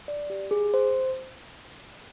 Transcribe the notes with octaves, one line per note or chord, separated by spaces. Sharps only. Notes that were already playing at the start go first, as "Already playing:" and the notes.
D5
G4
G#4
C5